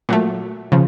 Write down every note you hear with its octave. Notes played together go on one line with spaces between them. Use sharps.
A#2 F#3 A3
C#3 F3